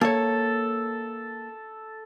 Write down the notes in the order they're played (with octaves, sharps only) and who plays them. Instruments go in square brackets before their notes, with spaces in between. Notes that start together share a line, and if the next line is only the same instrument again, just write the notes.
[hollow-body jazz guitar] A#3 C#5 [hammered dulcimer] A4